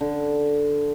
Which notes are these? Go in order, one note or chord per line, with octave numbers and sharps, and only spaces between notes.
D3